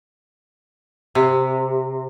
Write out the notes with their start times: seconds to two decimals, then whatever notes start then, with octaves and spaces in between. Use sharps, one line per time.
1.15 C3